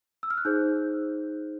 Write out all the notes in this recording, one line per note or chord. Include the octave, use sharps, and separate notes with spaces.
E6
F6
F#6
D#4 G#4 C5 G6